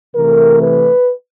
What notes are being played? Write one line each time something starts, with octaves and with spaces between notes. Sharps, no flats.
C3 E3 A3 A#4
B4